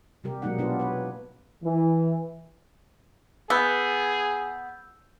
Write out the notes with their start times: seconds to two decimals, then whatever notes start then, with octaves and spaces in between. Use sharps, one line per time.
0.24 C3 G3 G4 A#4
0.42 B2 F#3 G#3 A#3 D#4 F#5
0.58 B2 B3 D4 F4 G4
0.79 B4 C#5
1.63 E3
3.50 B3 G#4 E6 G6